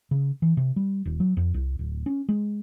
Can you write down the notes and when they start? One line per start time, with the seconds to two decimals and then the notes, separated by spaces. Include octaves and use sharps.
0.11 C#3
0.42 E3
0.57 C3
0.76 G3
1.06 D#1
1.20 F#3
1.37 F2
1.54 C2
1.79 D1
2.06 C#4
2.29 G#3